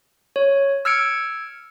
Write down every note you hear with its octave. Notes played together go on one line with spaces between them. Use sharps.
C#5
E6 F6 G#6 C#7 D7